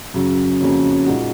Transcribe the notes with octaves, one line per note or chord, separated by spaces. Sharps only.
F#2 C#3 F#3
F2 C#3 F#3 A#3 C#4
A#2 G#3 D#4 F#4